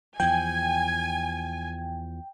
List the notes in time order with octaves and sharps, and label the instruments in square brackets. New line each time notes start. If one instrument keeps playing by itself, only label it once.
[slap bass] E2 F3 [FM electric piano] G5 [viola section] G#5